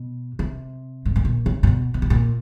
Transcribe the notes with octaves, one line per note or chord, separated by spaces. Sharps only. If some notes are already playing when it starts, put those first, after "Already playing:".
Already playing: B2
C3
G#2
A2
A#2
C#3
A#2
B2
C3
B2
A#2